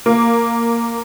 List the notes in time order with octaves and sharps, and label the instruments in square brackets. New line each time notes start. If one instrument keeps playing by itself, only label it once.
[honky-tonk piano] A#3